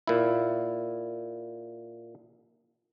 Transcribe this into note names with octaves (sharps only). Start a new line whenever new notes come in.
A#2 E4